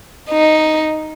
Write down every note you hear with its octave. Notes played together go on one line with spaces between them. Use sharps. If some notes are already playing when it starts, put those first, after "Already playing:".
D#4